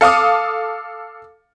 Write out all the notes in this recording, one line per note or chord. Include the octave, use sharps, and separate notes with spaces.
A4 F5 D6 D#6